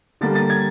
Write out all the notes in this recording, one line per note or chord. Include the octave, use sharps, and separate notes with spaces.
D3 G3 A#3 A6
A6
G#6